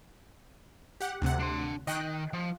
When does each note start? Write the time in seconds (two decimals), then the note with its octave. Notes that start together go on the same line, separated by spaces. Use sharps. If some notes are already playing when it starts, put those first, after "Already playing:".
1.00 G4 F#5
1.22 D2 C3 F#5
1.39 D4 C6
1.87 D#3 D#5 G5 F#6
2.33 F3